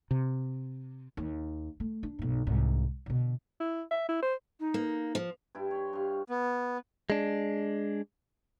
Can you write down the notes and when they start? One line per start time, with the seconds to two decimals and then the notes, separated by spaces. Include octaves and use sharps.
0.11 C3
1.17 D#2
1.80 A3
2.03 D4
2.19 B1 G2
2.47 C2 G#2
3.06 B2 D3
3.60 E4
3.91 E5
4.09 E4
4.22 C5
4.60 D#4
4.74 A#3
5.15 F3
5.55 G2 E4
5.71 C#5 C6
5.93 G2 F5
6.29 B3
7.10 G#3 D4